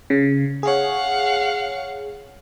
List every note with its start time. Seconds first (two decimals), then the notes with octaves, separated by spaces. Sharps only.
0.10 C#3
0.63 G#4 C#5 F5 F#5